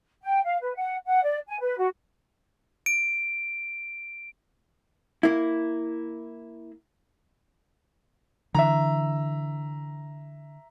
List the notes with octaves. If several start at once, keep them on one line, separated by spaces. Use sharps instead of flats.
G5
F5
B4
F#5
F#5
D5
G#5
B4
F#4
D7
A#3 E4
D3 E3 E5 A#5